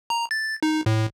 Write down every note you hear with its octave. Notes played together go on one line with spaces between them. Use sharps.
A#5
A6
D#4
A2